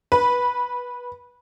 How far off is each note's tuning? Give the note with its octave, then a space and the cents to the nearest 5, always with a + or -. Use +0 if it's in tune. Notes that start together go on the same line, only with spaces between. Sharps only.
B4 -15